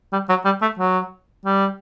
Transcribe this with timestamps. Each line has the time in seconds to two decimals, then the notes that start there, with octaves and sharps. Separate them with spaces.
0.13 G3
0.29 F#3
0.45 G3
0.62 A3
0.79 F#3
1.45 G3